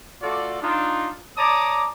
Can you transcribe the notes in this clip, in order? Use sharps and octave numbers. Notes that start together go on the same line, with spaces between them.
A3 F4 F#4 A4 D5
D4 D#4 F4
C#5 D5 A5 A#5 D6 D#6